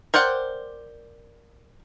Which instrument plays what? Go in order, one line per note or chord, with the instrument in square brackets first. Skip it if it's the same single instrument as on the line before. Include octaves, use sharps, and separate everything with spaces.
[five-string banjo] A#4 C5 D5 F#5 G5